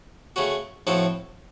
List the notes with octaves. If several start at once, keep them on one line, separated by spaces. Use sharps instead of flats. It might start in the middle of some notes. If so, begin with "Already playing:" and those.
C#3 A3 C#4 F#4
A2 F3 C4 F#4 A4